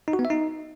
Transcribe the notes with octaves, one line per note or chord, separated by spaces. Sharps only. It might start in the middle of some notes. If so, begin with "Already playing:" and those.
D#4
F#4
B3
E5
D#4